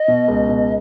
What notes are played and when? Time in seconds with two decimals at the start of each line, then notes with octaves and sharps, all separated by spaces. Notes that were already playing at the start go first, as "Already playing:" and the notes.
Already playing: D#5
0.08 B2
0.28 C#2
0.49 B2